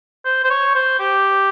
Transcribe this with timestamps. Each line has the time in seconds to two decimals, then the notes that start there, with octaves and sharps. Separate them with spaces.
0.25 C5
0.44 C5
0.50 C#5
0.75 C5
0.99 G4